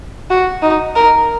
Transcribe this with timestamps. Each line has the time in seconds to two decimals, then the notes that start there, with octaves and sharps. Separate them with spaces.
0.30 F#4
0.62 D#4
0.96 A#4